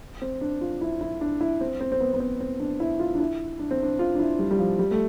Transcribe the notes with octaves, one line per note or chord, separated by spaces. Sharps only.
C4
D4
F4
E4
E4
D4
E4
C4
C4
C4
B3
B3
C4
C4
D4
E4
F4
D4
E4
D4
C4
D4
F4
D4
E4
G3
G3
F3
G3
A3